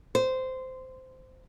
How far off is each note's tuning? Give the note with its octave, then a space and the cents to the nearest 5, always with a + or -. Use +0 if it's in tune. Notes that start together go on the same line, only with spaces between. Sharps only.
C5 -15